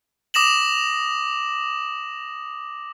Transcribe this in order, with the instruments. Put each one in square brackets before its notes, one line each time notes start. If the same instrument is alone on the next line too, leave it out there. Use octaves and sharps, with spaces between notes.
[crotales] D6 D#6 A#6 E7 F#7